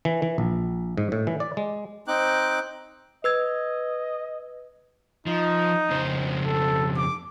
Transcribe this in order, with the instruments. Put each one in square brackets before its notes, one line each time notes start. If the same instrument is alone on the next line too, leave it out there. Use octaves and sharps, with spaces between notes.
[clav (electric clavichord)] E3
E3
A#1
G#2
A2
E3
D5
G#3
[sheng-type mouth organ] C4 D#4 G5 D6 F#6
[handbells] B4 E6 G#6 [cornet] D#5
[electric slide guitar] F3 [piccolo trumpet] D#4
[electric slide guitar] F2 C#3 C5
[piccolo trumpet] A4
D6